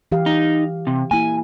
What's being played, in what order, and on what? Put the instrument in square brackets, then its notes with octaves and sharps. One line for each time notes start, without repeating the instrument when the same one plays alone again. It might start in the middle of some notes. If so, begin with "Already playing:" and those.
[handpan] E3 G4 F5
[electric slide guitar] D#4
C3
[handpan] A#3 E4 [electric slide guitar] G#5